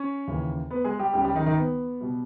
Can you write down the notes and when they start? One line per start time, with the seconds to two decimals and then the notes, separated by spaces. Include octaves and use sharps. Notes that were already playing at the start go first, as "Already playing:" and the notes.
Already playing: C#4 C#5
0.28 D#2 C#3 E3
0.71 B3 B4
0.85 G#3 G#4
0.99 G3 G4
1.13 C#2 C#3 G3 G4
1.24 G3 G4
1.35 D#3 D#4
1.46 D#3 D#4
1.57 B3
2.01 B2 G3